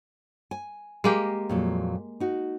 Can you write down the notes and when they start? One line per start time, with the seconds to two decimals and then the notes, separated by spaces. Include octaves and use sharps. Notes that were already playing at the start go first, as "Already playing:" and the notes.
0.51 G#5
1.04 G#3 A#3 G4
1.49 F2 A#2 F#3
2.20 D#4 F#4